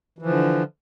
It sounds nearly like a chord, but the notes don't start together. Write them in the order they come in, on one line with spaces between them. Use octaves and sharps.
E3 F3 D3